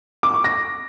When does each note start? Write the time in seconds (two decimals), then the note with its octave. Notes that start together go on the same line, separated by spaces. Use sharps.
0.23 D6
0.34 C#6
0.44 A#6